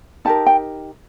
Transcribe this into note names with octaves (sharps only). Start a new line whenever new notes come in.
D#4 G4 A#4 A5
G5